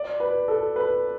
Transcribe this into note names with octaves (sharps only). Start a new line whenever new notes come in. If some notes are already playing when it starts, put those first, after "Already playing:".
Already playing: D5
B4
A4
B4